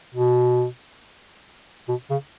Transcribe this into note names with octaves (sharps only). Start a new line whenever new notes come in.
B2
B2
C#3